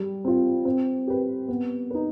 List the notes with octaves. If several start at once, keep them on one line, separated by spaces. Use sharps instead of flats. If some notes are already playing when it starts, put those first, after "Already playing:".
Already playing: G3
C4 F4
C4
G4 B4
B3
D#4 B4